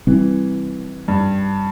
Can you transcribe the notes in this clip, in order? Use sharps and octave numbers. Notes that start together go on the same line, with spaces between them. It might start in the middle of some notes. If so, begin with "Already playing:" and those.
C3 E3 G3 C4
G2